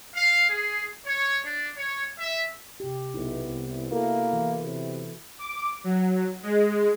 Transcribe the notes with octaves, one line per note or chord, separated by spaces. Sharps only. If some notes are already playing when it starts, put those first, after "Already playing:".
F5
G#4
C#5
D4
C#5
E5
C3 G4
B1 B3 E4
C2
A#3 E4 F#4 A4
E3
C3
D6
F#3
G#3